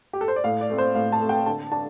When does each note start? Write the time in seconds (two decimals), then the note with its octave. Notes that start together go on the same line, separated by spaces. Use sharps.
0.13 G4
0.21 A4
0.28 C5
0.36 D5
0.44 A2 F5
0.61 D5
0.70 A3 C4
0.78 C5
0.95 A2 F5
1.12 A5
1.21 A3 C4
1.29 G5
1.46 D3 A5
1.72 D4 A5